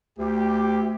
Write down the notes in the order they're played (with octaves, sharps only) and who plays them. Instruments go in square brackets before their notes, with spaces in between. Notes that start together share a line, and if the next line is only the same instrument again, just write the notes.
[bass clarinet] D2 [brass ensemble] G4